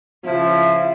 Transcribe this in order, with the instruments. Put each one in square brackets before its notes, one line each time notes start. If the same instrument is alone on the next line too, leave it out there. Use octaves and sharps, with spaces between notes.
[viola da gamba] C#3 E4 [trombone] F3